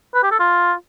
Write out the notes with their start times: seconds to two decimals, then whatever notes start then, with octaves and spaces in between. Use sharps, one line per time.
0.14 B4
0.23 G4
0.31 A4
0.40 F4